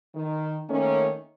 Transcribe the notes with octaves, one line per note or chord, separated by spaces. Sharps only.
D#3
D#3 A3 A#3 C#4